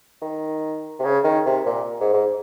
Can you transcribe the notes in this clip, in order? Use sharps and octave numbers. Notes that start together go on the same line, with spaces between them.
D#3
C3
C#3
D#3
C3
A#2
G#2
G#2